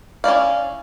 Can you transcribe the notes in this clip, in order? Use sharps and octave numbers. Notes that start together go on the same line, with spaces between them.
C#4 E4 D5 F5